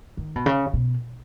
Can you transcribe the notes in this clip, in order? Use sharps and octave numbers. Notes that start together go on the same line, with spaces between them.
D#3
B2
C#3
B2